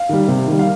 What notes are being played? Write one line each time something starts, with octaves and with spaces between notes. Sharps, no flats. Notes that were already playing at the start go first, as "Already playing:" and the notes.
Already playing: F5
D#3 G3
C3
D#3 G3
F5